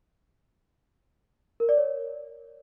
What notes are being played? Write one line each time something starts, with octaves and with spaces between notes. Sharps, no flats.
A#4
D5
C#5